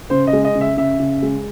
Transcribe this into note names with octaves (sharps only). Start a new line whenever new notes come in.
C#3 C5
D#5
G#3
D#5
C#3
E5
C#3 E5
C#3
G#3